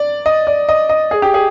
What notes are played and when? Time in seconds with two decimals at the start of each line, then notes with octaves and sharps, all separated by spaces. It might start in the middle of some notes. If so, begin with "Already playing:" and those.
Already playing: D5
0.26 D#5
0.47 D5
0.69 D#5
0.89 D#5
1.11 G#4
1.22 G4
1.34 G#4